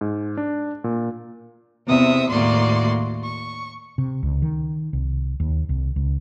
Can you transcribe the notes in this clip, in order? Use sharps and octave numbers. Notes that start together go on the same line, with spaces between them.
G#2
D4
A#2
E2 C3 E5 D#6
D#2 A2 A#3 F#4 D5 C6
C#6
C3
C#2
D#3
C2
D#2
C2
C#2